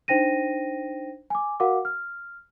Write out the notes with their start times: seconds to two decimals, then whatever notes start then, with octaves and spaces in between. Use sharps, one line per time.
0.08 D4 D#4 C5 G5 A#6 D#7
1.30 G#5 D6
1.60 F#4 A#4 F5 F#5 D6
1.85 F6